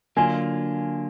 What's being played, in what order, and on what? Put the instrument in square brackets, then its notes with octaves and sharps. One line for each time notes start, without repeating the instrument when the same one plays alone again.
[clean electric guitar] D3 F#3 A#3 D4 F4 [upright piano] G#5